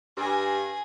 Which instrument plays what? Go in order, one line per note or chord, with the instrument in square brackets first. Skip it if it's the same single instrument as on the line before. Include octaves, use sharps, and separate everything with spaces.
[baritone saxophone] G2 [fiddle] G#4 G#5